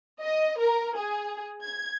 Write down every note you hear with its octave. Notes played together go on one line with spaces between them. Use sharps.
D#5
A#4
G#4
G#6